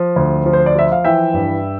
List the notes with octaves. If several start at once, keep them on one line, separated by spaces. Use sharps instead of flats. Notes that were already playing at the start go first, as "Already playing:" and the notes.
Already playing: F3
D2
F3
C5
D5
F3 E5
F5
E3 E5 G5
G2